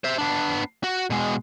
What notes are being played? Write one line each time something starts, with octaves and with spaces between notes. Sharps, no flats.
C5 E5
B3 D4
F#4
B2 G#3